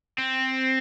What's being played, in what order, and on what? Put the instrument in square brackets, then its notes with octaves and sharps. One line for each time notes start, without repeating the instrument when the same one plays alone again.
[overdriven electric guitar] C4